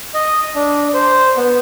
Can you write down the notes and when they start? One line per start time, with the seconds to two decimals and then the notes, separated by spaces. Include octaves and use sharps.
0.14 D#5
0.56 D4
0.94 C5
1.37 B3